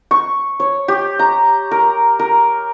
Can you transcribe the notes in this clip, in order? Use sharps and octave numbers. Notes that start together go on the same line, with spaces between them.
C#6
C#5
G4
A#5
A#4
A#4